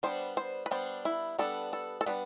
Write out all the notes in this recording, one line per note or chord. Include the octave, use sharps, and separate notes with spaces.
G3 B3 D4 C5
C5
B4
G3 B3 D4 C5
E4
G3 B3 D4 A4
A4
A4
G3 B3 D4 B4